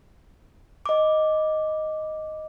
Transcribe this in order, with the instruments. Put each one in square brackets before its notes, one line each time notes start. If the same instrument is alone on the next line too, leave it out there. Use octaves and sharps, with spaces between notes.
[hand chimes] D#5 D6